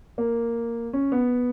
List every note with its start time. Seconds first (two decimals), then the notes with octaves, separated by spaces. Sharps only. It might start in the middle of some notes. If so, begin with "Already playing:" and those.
0.18 A#3
0.93 C#4
1.12 B3